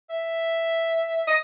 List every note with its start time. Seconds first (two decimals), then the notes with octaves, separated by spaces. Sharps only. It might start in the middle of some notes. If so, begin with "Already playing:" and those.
0.10 E5
1.27 D#5